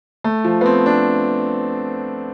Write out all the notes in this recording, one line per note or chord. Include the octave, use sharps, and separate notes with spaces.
A3
F3
B3
C4
D4